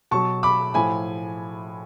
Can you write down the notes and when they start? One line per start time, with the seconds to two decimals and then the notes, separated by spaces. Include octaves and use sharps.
0.11 B2 F#3 A5 C#6
0.43 B5 D6
0.74 A2 F3 G#5 B5